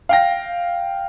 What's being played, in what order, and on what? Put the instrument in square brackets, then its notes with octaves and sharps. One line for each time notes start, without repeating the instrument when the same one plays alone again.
[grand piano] F5 G5 A#6